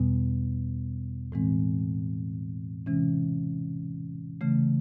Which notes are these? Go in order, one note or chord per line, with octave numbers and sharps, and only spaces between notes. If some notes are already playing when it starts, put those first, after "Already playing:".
Already playing: E2 B2 G3 B3
A2 E3 G#3 C4
C3 E3 G#3 C#4
C#3 E3 A3